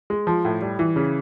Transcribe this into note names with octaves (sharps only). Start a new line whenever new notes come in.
G#3
F3
A2
G3
E3
C#3